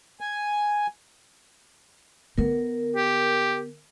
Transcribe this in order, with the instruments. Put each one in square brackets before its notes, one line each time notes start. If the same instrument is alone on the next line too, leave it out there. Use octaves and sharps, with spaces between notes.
[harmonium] G#5
[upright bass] D3 B3 [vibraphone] A#4
[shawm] G4